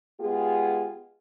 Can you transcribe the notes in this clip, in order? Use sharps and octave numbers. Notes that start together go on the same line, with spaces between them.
G#3 B3 F4 G4 G#4